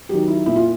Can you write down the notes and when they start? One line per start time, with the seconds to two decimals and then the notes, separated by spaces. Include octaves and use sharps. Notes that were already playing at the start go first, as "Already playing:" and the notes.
0.09 D#3 F#3 G4
0.28 E4
0.46 A#2 E4
0.56 F4